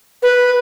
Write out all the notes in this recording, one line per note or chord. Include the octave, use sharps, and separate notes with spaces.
B4